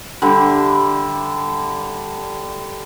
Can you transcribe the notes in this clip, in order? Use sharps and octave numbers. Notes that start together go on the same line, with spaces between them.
D3 G3 E5